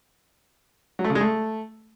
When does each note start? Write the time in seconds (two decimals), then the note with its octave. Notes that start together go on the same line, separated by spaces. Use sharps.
0.99 F#3
1.04 A3
1.10 C#3
1.15 G#3
1.21 A3